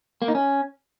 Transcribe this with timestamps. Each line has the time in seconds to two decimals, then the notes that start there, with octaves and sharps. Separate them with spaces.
0.22 A#3
0.28 D#4
0.35 C#4